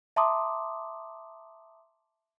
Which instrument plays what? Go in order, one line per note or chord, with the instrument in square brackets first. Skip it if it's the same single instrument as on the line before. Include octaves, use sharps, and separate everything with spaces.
[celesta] E5 A5 A#5 C6 D6 D#6